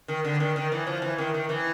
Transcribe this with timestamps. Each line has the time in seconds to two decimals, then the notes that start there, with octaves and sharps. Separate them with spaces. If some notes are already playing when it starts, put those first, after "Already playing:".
0.08 D#3
0.25 D3
0.40 D#3
0.56 D#3
0.72 E3
0.87 F3
1.02 E3
1.18 D#3
1.34 D#3
1.49 E3